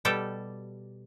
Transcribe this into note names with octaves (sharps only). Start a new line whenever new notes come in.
B2 G3 G4 A4 G5